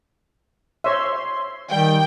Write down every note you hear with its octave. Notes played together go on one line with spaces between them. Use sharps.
C5 C#5 E5 C6
D#3 G3 G5